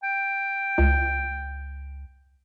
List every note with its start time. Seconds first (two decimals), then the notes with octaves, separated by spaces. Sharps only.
0.03 G5
0.78 C#2